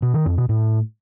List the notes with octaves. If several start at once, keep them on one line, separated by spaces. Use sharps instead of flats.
B2
D#3
F2
B2
A2